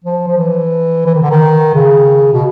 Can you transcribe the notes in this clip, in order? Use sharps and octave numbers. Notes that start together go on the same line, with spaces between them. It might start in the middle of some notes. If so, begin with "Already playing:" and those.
F3
F3
E3
E3
D#3
D3
D#3
C#3
B2